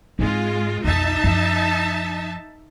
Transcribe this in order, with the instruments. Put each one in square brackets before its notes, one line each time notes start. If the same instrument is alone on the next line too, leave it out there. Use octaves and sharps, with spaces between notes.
[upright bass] G#2 C4 [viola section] G#3 F4
[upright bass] B1 F2 [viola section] D#4 E5 A5
[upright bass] F#2 F3